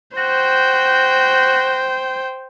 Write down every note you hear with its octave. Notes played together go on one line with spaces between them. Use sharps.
F#4 C5 G5